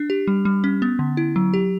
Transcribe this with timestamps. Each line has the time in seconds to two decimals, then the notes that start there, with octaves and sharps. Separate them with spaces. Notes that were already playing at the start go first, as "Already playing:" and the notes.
Already playing: D4
0.10 G4
0.27 G3
0.45 G3
0.64 C#4
0.82 B3
0.99 D3
1.17 E4
1.36 F#3
1.54 G4